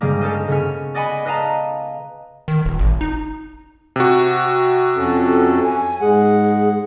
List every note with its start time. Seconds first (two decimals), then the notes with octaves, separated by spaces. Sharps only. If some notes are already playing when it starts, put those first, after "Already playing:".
0.01 G2 C#3 G3 G#3 A#3
0.21 C#4 A4 A#4 C5 D#5
0.48 C#3 B3 C#4
0.95 D5 D#5 F#5 G#5 B5
1.25 B4 D#5 F5 A5 A#5
2.48 D#3
2.65 D#1
2.79 G#1
3.01 D#4
3.96 C3 F#4
4.97 F2 C#4 A4
5.63 G#5
6.01 G#2 G#3 G#4 F#5